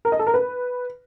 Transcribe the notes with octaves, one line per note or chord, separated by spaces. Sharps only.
A#4
D#5
A4
A#4
B4